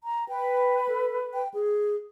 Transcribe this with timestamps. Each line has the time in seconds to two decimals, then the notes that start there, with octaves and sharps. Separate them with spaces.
0.04 A#5
0.29 B4 G5
0.89 A4
1.34 G5
1.54 G#4